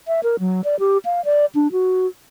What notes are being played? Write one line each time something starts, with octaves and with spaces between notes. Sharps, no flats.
E5
A#4
F#3
D5
G4
F5
D5
D4
F#4